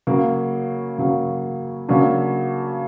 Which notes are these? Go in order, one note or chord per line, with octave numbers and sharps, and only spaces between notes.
C#3 F#3 A#3
C#3 F#3 A#3
C#3 F#3 A#3 D4